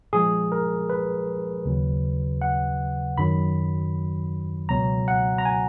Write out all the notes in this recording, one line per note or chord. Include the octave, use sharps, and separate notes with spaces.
A#2 F3 G#3 G#4
A#4
B4
D#2 C#3 F#3
F#5
F#2 D#3 F#3 B5
C#2 B2 F#3 A#5
F#5
A#5
G#5